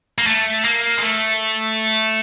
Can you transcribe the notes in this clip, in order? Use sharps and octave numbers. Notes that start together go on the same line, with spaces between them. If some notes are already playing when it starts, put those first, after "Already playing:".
A#3
A3
A#3
G#3
A3